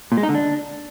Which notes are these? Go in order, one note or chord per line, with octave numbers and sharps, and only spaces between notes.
A#2
G#3
D#4
D3
D4